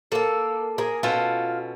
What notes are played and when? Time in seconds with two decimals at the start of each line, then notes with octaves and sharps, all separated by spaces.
0.12 A#3 A4 A5
0.78 G#4 A#4
1.03 B2 C#4 F4 A4